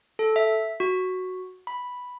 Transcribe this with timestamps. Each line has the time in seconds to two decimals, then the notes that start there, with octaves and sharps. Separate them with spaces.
0.19 A4
0.36 E5
0.80 F#4
1.67 B5